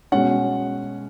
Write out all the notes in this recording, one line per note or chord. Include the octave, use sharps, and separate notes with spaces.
B2 G#3 C#4 F#5